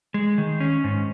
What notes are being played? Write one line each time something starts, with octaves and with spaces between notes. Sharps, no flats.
G#3
D#3
C#4
G#2